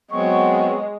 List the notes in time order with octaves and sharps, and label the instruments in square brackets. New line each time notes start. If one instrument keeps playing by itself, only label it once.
[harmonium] F#3 B3 C4 [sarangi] G#3 [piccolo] C#6